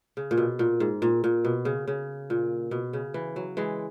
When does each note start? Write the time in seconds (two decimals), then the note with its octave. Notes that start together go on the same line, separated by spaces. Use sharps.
0.17 C#3
0.31 A#2
0.37 B2
0.59 A#2
0.80 G#2
1.02 A#2
1.24 A#2
1.45 B2
1.65 C#3
1.88 C#3
2.30 A#2
2.71 B2
2.93 C#3
3.14 E3
3.36 F#3
3.57 E3 G#3